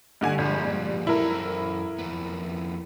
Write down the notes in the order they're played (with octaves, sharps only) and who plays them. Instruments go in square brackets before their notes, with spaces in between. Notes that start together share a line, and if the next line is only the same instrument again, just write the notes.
[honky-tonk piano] G2 D3 G#5
[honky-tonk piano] G1 [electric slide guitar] A#2 F3 G#3
[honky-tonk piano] G2
[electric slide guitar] F#2 A4 [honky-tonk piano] E4 A#4
[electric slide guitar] F2 B3